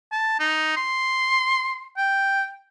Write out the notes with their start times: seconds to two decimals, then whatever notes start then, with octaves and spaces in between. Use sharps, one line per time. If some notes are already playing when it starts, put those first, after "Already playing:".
0.12 A5
0.39 D#4
0.77 C6
1.97 G5